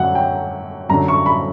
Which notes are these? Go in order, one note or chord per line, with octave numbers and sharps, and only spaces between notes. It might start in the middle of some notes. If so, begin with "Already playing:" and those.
Already playing: F#2 D3 F#3 F#5
G5
F#2 D3 F#3 A#5
C#6
B5